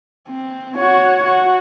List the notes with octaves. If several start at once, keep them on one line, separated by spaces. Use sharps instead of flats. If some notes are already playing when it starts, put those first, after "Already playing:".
C4
F#4 C#5
F#4